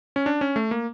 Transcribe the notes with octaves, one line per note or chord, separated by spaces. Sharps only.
C#4
D4
C#4
A3
A#3